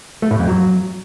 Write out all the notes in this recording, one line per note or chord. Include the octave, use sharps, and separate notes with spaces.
A3
A2
F2
F#3